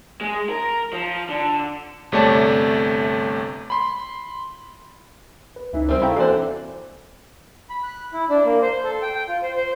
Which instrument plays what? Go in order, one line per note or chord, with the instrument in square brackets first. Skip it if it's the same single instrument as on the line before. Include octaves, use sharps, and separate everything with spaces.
[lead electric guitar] G#3
A#4
F3
D3
[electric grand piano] G1 C3 A3 C#5 D5 A5
B5 C6
[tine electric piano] B4
[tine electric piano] C#2 C#4 D#4 [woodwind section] E3
[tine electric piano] D2 C3 [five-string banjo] G3 C4
[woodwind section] A3 [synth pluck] E4 A4 G5 [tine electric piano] F5 A#5
[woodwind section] D3 [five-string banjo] E3 C5 [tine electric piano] A#3 C4 F#4 [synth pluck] C6 F#6
[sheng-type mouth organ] B5
F#6
E4
D4
A#3
C5
A4
G5
G5
F4
C5
C5